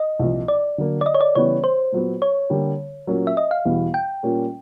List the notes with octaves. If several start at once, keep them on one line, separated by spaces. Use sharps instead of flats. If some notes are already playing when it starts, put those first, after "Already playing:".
Already playing: D#5
C2 A#2 F3
D5
D3 F#3 A#3
D5
D#5
C#5
D5
C#3 E3 G3 B3 C#5
C5
A#2 F#3 B3
C#5
D3 G3 A#3
A#2 F#3 A#3 C#4
E5
D#5
F5
E2 B2 G3 B3 E4
G5
A#2 G3 A#3 C#4